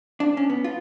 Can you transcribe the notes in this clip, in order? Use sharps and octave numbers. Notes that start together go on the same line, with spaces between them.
D4
C#4
B3
F4